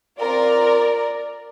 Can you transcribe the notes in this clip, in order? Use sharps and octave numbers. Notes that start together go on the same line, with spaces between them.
C4 F4 A#4 D5